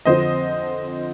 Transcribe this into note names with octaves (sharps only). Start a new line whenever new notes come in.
F2 D3 F3 C4 C5 D#5